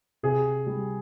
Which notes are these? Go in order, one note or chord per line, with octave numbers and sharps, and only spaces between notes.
C3 G#4
G3